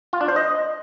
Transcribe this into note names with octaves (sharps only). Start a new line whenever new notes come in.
F4
D4
C5
D#5